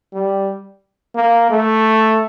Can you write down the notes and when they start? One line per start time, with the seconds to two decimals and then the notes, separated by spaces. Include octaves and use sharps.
0.13 G3
1.15 A#3
1.50 A3